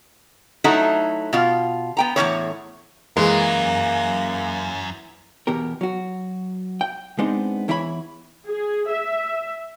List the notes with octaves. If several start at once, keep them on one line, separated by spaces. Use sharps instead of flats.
F#3 A3 D#4 E4 F#4
B2 F4
B3 G5 A#5
E2 A2 C#3 C#5
F#2 E3 G#3 A#3
E2 B2 G4 A#4
F#3 F#4
G5
G#3 B3 C4 D4 D#4
E2 E3 E4 C#5 D5 B5
G#4
E5